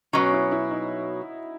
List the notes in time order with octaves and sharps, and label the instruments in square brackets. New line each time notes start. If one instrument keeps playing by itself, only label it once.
[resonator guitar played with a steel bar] B2 F#3 C#4 [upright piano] F#4
[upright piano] E4
E4
D#4